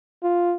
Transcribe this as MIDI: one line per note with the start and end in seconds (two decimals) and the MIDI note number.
0.23 0.55 65